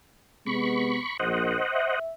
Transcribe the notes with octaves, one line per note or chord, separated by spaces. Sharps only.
C3 G#3 B3 B5 C#6
A#1 C5 D#5 F#5
E5